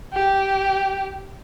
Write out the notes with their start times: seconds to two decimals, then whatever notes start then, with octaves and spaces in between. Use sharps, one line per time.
0.13 G4